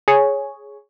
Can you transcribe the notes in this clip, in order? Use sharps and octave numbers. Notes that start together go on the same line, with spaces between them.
G#4 C#5